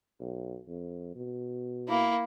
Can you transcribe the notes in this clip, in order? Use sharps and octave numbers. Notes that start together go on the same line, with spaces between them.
B1
F2
B2
A#3 E4